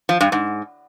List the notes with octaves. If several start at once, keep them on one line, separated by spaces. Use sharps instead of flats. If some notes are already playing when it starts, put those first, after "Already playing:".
F3
G2
G#2